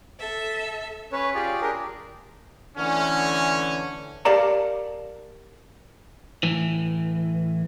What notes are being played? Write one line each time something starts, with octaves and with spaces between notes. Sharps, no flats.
A4 E5
C#4 B4 C#5
F4 G4 G#4 D5
D4 G4 G#4 A#4
D3 E3 A3 C#4
G4 A#4 D5 F5 A5 A#5
A2 E3